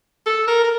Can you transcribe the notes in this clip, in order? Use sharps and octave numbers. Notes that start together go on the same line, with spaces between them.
A4
A#4
A#4